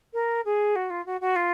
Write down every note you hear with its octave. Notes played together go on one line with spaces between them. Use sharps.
A#4
G#4
F#4
F4
F#4
F#4
F4